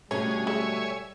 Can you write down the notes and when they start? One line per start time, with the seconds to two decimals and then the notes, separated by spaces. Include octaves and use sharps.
0.11 B2 D3 G3 A3 C#4 G#4 C#5
0.47 G#3 C#5 E5 G#5